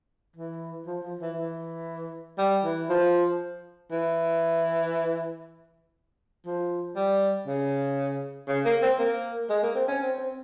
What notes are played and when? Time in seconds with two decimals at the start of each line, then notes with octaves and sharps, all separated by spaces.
0.36 E3
0.86 F3
1.03 F3
1.20 E3
1.37 E3
2.38 G3
2.64 E3
2.89 F3
3.91 E3
6.46 F3
6.96 G3
7.47 C#3
8.48 C#3
8.65 A#3
8.82 C4
8.99 A#3
9.50 G#3
9.63 A#3
9.75 C4
9.88 C#4
10.02 C4
10.18 C4